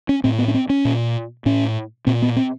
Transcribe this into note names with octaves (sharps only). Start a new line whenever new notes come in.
C#4
A2 C4
B3
C#4
C4
C#4
A#2
A2 C#4
A#2 C4
B3
C4